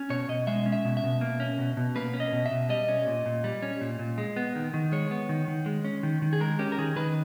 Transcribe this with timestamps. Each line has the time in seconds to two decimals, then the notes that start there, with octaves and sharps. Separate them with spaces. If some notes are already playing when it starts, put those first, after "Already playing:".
Already playing: C#4
0.10 B2 C#5
0.28 B2 D#5
0.47 G#3 E5
0.66 C#4
0.72 E5
0.85 B2
0.97 E5
1.04 B2
1.21 A#3
1.40 C#4
1.59 B2
1.77 B2
1.96 A#3 B4
2.14 C#4
2.20 D#5
2.32 B2
2.46 E5
2.51 B2
2.69 G3 D#5
2.89 C#4
3.07 A#2
3.26 A#2
3.44 G3
3.62 C#4
3.81 A#2
3.99 A#2
4.18 G#3
4.36 B3
4.55 D#3
4.74 D#3
4.92 G#3 C#5
5.11 B3
5.29 D#3
5.48 D#3
5.66 G#3
5.84 C#4
6.03 D#3
6.22 D#3
6.33 G#4
6.40 G#3 A#4
6.59 C#4 G4
6.72 A#4
6.78 D#3 G#4
6.96 D#3 B4